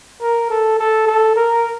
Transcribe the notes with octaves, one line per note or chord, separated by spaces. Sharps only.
A#4
A4
A4
A4
A#4